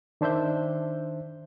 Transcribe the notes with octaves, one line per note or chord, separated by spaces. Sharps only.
D#3 D4 C5 E5 G6